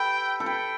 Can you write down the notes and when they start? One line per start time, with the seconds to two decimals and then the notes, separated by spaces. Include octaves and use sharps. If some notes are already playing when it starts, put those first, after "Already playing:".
Already playing: G4 A4 B4 G5
0.40 A4
0.46 B4 G5